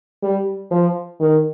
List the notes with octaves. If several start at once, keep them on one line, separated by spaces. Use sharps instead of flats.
G3
F3
D#3